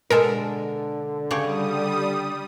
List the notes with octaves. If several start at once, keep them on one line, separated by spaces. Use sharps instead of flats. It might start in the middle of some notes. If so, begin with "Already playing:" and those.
B2 D3 G#3 A4 A#4
C#3 G3 G4 C#5 D#6